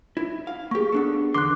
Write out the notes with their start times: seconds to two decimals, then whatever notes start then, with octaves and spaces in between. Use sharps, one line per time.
0.17 E4
0.47 F5
0.71 A#3 G4 G#4 C#6
0.92 B3 D4 A4
1.34 E2 D3 C6 D6 F#6